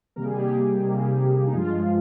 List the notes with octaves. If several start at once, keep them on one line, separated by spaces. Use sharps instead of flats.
C3 D#3 G3 A#3 A#4
G#4
G4
G#4
C3 D#3 G3 A#3
D#4
G2 F3 G#3 F4